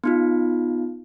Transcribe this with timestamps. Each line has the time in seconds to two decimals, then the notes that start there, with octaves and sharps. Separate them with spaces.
0.04 B3 D#4 F4